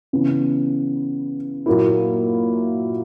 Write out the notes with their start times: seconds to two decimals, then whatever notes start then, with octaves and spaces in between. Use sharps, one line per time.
0.13 C#3 E3 B3
1.66 A#2 F#3 A#3 E4